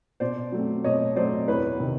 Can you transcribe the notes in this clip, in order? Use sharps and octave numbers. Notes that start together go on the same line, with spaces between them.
B2 C5 D5
F#3 A3 C4
B2 C#5 D#5
F#3 A3 C4 C5 D5
E2 B4 C#5
C3 D#3